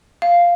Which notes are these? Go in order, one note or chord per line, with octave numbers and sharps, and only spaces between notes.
F5